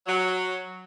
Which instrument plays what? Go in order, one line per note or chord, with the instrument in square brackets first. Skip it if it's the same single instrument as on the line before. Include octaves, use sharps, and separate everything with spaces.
[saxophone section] F#3